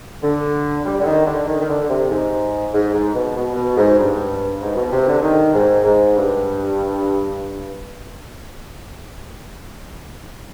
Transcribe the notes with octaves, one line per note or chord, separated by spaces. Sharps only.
D3
G3
D3
D#3
D3
D#3
D#3
D3
C3
G#2
G#2
G#2
B2
B2
B2
G#2
G2
G#2
B2
C3
D3
D#3
G#2
G#2
G2